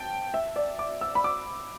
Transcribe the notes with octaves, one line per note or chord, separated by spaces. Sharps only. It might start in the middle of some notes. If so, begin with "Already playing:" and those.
Already playing: G5 A5
E5
D5
D6
E6
B5
D6